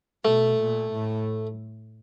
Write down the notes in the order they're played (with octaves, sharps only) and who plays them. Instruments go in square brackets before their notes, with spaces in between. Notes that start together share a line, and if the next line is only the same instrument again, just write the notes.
[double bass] B2 [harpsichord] A3
[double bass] A#2
A2